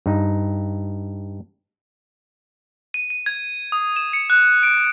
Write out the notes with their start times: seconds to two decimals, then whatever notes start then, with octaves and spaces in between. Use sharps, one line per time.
0.06 G2 D#4
2.94 D#7
3.10 D#7
3.26 G#6
3.72 D#6
3.96 E7
4.13 C#7
4.30 F#6
4.63 D7